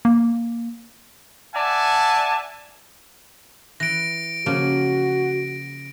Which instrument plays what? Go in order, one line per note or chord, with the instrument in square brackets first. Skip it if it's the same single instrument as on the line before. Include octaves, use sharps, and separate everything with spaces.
[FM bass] A#3
[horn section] D5 E5 F#5 G#5 A5
[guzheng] E3 [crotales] A#6 D7
[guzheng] C#3 F3 A#3 [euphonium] F#4